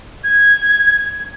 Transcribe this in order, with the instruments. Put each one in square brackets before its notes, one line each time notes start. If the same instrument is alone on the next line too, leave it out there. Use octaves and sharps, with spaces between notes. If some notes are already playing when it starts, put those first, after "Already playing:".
[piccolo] G#6